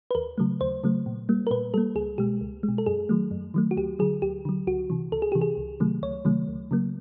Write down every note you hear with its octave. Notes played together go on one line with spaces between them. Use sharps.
B4
D#2 A#4
C#3 F#3 A3
D#2 C5
C#3 F#3 A3
A#2
G3 A#3
A#4
A#2 B4
G3 A#3 A4
C#2 G#4
B2 G#3 G4
C#2
G#3
B2
A4
F#2 G#4
D#3 F#3 A3
F#2
D#3 F#3 A3
F#4
D2 G4
D3 F#3 G#4
D2 G4
D3 F#3
C#2 F#4
C3 E3
C#2 A4
G#4
C3 E3 G4
G#4
C#2
C3 D#3 F#3 A3
C#2 C#5
C3 D#3 F#3 A3
C#2
C#3 F#3 A#3